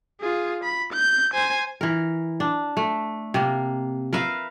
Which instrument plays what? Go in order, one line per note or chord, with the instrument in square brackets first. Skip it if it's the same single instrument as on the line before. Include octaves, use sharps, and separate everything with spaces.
[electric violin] F4 G#4
B5
G6
C5 G#5
[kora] E3 A#4
D4
A3
C3 A#3
A#4 B4 E5 F5